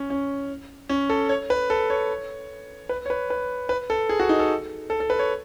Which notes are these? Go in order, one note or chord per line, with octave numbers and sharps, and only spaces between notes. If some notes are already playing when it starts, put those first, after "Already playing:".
Already playing: C#4
C#4
C#4
A4
C#5
B4
A4
C#5
B4
C#5
B4
B4
B4
A4
G#4
F#4
D#4
A4
A4
A4
B4
C#5